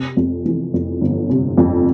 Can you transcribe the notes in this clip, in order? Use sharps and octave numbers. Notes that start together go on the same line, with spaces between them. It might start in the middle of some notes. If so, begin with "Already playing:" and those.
Already playing: C3
F2
E3
F2
G1
C3
F2